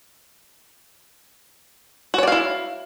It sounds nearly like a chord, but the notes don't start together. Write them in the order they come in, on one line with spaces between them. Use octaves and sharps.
F#4 C#5 D5 F5 E4